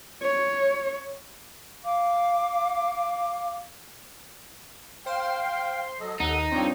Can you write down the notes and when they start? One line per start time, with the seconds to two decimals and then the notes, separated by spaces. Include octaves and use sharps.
0.23 C#5
1.84 F5 D6
5.06 C5 F5 G5 C6
6.00 F#3 A4 D#5
6.20 D#2 D#4 A4 F#5
6.51 G2 F3 C4 D4 C#5 G5